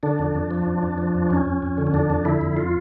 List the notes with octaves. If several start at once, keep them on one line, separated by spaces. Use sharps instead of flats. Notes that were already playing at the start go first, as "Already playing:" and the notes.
D3 D4
F2
F2
F3
F2
F2
F3
F2
F2 C#4
F2
F2
D3
C#4
F2 D4
F2
D3 E4
F2
F4